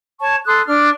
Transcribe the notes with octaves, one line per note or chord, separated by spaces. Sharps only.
C#5 A5 C#6
A4 C6 D#6 F#6
D4 F6